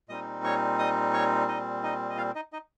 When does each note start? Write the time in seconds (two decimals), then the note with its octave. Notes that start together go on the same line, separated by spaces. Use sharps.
0.09 A#2 G3 C4 D#4 D#5 D#6
0.44 C#5 C#6
0.79 D#5 D#6
1.14 C#5 C#6
1.48 D#4 D#5
1.83 D#4 D#5
2.10 D#5
2.17 F4 F5
2.35 D#4 D#5
2.53 D#4 D#5